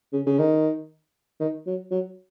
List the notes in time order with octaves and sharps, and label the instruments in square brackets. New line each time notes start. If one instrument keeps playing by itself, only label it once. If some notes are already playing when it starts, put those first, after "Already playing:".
[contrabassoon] C#3
C#3
D#3
D#3
F#3
F#3